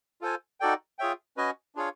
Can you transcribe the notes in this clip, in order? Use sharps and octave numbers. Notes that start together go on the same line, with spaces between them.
F4 A4 C5 F5 G#5
D#4 F#4 A4 D5 G5
F4 G#4 C#5 E5 G5
C#4 F#4 B4 D#5 G#5
D4 F4 G#4 C#5 F5